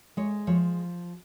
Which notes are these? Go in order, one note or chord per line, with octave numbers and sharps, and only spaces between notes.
G#3 C#5
F3 C#5